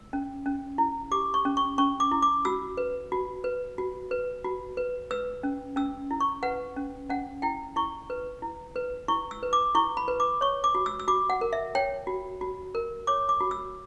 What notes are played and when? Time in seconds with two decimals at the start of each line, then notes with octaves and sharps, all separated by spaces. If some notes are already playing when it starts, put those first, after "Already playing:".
Already playing: E6
0.13 C#4
0.46 C#4
0.78 E4
1.11 G4 D6
1.34 C#6
1.45 C#4
1.57 C#6
1.78 C#4 C#6
2.00 D6
2.11 E4
2.22 D6
2.45 F#4 E6
2.77 B4
3.12 F#4
3.44 B4
3.78 F#4
4.11 B4
4.44 F#4
4.77 B4
5.11 B4 E6
5.43 C#4
5.76 C#4 E6
6.11 E4
6.21 C#6
6.43 B4 F#5
6.76 C#4
7.09 C#4 F#5
7.42 E4 G5
7.76 E4 C#6
8.10 B4
8.42 E4
8.76 B4
9.08 E4 C#6
9.31 E6
9.43 B4
9.53 D6
9.75 E4 C#6
9.97 B5
10.08 B4
10.20 D6
10.41 C#5 C#6
10.64 D6
10.75 F#4
10.86 E6
11.00 E6
11.08 F#4 D6
11.30 F#5
11.41 A#4
11.53 E5
11.75 C#5 G5
12.07 F#4
12.41 F#4
12.75 A#4
13.07 C#5 D6
13.29 D6
13.41 F#4
13.51 E6